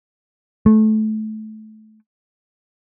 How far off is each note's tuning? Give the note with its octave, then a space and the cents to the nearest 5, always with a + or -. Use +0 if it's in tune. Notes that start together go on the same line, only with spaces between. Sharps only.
A3 -20